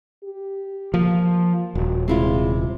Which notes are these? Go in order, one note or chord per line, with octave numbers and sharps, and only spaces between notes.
G4
F3 A#3
D#1 F#4
C3 G#3 E4 F4